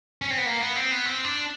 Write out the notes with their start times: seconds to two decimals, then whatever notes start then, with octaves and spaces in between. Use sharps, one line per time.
0.22 C#4
0.30 C4
0.38 B3
0.46 A#3
0.61 B3
0.76 C4
0.91 B3
1.06 C4
1.24 D4